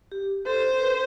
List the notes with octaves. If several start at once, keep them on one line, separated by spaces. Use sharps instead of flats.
G4
A4 C5
B4